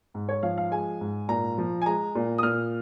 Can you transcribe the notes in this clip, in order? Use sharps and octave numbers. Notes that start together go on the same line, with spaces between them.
G#2
C#5
F3 F5
F5
G#3 G#5
G#2
A#2 A#5
F3
G#5
G#3 A#5
A#2
D#6
A#2 F6